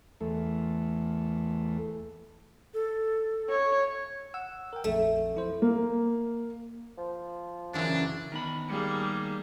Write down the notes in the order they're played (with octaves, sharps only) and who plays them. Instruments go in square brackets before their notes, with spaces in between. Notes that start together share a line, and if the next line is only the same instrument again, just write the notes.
[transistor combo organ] E2 A3
[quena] A4
[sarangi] C#5
[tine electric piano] F#5 E6
A#4 G5
[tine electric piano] A#1 F2 [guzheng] A3
[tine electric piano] F3 E4 C5
[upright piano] A#3
[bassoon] F3
[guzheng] F#2 E3 [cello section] C#3 [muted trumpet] D4
[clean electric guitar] D#3 B3 B5
[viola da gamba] G3 A#3 G#4